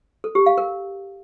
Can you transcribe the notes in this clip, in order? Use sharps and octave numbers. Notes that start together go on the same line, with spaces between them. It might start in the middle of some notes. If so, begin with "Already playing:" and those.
A4
G4
F5
A#4